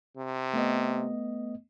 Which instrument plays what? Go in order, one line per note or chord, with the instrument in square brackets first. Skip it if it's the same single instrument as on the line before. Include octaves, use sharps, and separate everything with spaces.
[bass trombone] C3
[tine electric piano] A3 B3 D#5